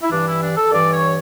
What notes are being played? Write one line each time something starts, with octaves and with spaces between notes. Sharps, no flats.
E4
G2 E3 D4
E4
D4
A4
G2 E3 D5
C#5